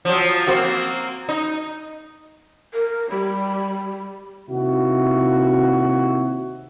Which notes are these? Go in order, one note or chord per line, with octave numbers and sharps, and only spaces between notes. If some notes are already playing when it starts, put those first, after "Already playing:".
F3 F#3
A#3 C4 F#4
D#4
A#4
G3 B5
D#2 C3 E4 F#4